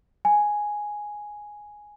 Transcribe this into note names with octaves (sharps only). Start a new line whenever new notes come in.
G#5